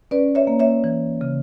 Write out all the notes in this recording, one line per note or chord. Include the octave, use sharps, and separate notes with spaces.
C#4 B4 D5
C#5 E5
A#3
C#5 E5
E3
C#3